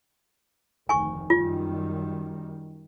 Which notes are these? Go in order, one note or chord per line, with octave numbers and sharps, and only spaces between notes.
F1 D2 D#3 G#5 C#6
F#2 D#3 G3 F4